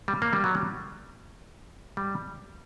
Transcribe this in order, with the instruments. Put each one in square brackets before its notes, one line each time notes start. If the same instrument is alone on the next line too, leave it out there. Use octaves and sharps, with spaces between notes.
[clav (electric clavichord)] G3
A#3
G3
F#3
G3
G3